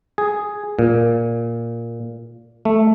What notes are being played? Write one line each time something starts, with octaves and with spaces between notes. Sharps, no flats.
G#4
A#2
A3